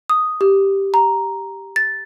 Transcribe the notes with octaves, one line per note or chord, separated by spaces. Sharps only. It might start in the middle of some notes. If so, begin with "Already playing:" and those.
D#6
G4
A#5
A6